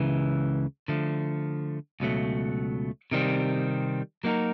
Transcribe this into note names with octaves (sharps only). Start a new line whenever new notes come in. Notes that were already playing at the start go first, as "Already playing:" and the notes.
Already playing: C#2 C#3 E3
D3 F3 A3
C#2 B2 F#3 A3
C3 D#3 G3 C4
F#3 A#3 D#4 F#4 A#4